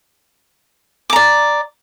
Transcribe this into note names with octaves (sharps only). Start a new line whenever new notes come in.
D5 A#5 D6